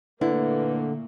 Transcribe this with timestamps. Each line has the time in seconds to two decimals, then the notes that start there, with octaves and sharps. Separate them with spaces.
0.21 A#2 D3 A3 A#3 E4 B4